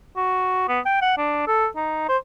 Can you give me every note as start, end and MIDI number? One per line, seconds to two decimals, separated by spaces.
0.17 0.67 66
0.69 0.80 59
0.86 0.98 79
1.02 1.16 78
1.18 1.47 62
1.47 1.67 69
1.76 2.06 63
2.09 2.17 72